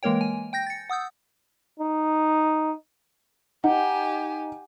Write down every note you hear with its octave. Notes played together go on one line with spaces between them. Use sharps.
E3 G#3 A#3 A#4 C#5 G5
G#5
G5 G6 A#6
A6 C#7
F#5 D#6 E6 G6
D#4
D#4 G4 F#5 G#5